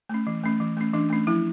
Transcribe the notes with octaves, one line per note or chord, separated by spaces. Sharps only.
A3 C#4
E3
A3 C#4
E3
A3 C#4
E3 D4
A3 C#4
F3 E4